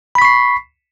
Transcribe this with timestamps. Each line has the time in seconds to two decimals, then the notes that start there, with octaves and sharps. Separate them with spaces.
0.15 B5
0.18 B6
0.22 C#6
0.25 C7